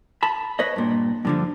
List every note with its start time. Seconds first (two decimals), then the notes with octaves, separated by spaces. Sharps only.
0.23 A5 B5
0.59 B4 C#5 D#5
0.76 G2 A#2
1.25 G2 D3 F3